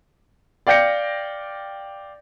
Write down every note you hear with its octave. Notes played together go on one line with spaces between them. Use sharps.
D5 F5 G5 G6 A#6 C#7